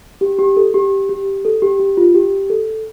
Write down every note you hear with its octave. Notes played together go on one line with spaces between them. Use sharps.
G4
G4
A4
G4
G4
A4
G4
G4
F4
G4
A4